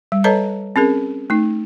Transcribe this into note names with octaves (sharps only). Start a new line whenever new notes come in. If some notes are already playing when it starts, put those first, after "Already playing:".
G3
A4 B4 C#5 D#5 A5 A#5
C4 C#4 G#4 A#4
A3 D#4